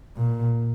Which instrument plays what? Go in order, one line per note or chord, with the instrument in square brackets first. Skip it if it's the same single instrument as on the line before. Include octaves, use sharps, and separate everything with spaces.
[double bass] A#2